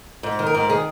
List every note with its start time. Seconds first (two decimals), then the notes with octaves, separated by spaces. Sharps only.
0.23 G#2
0.39 D#3
0.46 A#4
0.54 G#2
0.70 D#3 G#4